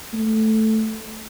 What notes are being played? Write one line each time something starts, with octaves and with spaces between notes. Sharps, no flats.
A3